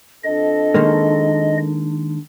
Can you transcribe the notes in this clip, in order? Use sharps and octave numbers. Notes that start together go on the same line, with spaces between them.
F2 D4 A4 D#5
D#3 G#3 A#3